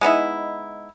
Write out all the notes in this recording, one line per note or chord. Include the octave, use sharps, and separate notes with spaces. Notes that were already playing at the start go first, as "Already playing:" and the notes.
G#3 B3 D#4 E4